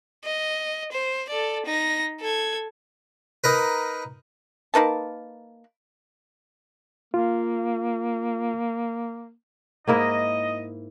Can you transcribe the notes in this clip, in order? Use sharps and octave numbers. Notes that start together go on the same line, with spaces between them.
D#5
C5
A4 D5
D#4 A#6
A4 G#6
D#4 A#4 B4
A#3 D#4 B4 A5
A#3 F4
G#2 A#3 E4 D#5